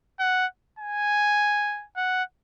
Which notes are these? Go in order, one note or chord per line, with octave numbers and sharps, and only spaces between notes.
F#5
G#5
F#5